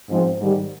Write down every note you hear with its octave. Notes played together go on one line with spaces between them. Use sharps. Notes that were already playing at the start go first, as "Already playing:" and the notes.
G#2 F3 G#3 C4
G#2 D#3 G3